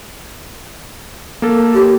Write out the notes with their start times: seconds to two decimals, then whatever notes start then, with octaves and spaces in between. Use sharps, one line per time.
1.42 A#3 A4
1.74 G4